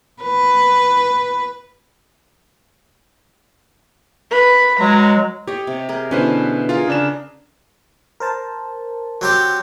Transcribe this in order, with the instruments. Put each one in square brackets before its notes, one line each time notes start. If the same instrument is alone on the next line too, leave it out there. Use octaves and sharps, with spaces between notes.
[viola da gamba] B4
[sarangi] B4
[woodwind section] F#3 G#3 [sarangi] A#5
[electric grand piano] G4 [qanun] C#5 D#5
[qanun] C3
G#4 A#4 D#5
[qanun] B2 D3 E3 [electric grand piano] C#4 B4 C5
[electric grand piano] F4 [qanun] G#4 A#4 F5
[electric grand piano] C#3 D4 E7
[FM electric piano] A#4 C5 A5
[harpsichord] F#3 C4 G4